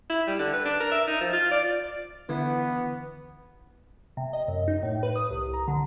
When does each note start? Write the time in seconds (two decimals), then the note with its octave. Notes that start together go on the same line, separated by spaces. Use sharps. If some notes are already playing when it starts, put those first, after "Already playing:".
0.10 E4
0.27 G3
0.39 D3
0.53 B4
0.65 D4
0.80 A#4
0.92 E5
1.08 D#4
1.21 F3
1.33 F4
1.51 D5
2.29 D3 E3 B3
4.17 C3
4.33 D#5
4.48 F#2
4.68 D#4
4.83 A2
5.03 B4
5.16 D#6
5.30 C2
5.54 A#5
5.68 D3